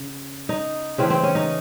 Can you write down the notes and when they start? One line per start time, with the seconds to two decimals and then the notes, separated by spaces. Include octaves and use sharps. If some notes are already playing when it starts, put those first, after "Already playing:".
Already playing: C#3
0.49 D#4
0.98 C#3 E3 A3 C4
1.10 C4
1.23 C#4
1.35 D#4